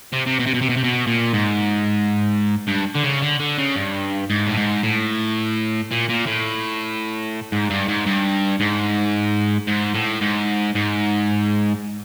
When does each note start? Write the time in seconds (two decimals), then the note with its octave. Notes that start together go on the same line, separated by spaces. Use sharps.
0.13 C3
0.26 C3
0.40 B2
0.47 C3
0.54 B2
0.62 C3
0.70 B2
0.77 C3
0.84 B2
1.07 A#2
1.33 G#2
2.68 G2
2.95 D3
3.04 C#3
3.22 D3
3.40 D3
3.58 C#3
3.75 G2
4.30 G#2
4.47 A2
4.57 G#2
4.83 A2
5.91 A#2
6.09 A#2
6.27 A2
7.52 G#2
7.70 G2
7.88 G#2
8.06 G2
8.60 G#2
9.68 G#2
9.94 A2
10.22 G#2
10.75 G#2